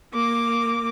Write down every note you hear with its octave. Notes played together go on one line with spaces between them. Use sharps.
A#3 D6